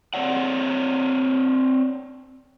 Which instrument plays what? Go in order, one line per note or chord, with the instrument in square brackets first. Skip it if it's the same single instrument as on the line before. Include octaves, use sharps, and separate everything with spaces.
[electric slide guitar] C4 C#5 D5 F#5